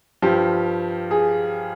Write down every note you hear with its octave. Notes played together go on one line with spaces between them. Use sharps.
G2 F3 G4
G#4